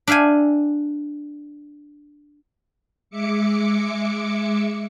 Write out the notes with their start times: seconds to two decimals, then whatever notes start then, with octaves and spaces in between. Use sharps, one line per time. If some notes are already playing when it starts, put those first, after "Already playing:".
0.07 D4 E5 F5 G5 G#5
3.10 G#3 E5 D6 C#7